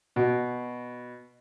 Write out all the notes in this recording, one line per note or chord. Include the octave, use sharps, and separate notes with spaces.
B2